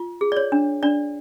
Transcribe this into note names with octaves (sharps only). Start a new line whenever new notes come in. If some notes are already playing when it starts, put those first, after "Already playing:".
Already playing: F4
G#4
D5
C#5
D4
D4 D5